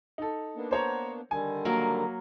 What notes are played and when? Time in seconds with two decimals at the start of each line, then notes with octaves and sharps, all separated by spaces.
0.18 D#4 A4
0.56 A#3 B3 D4
0.71 C5 C#5 A#5
1.31 D3 D#3 G3 G#5
1.65 F#3 A#3 A#4